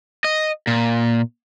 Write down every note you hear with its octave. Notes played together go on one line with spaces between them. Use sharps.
D#5
A#2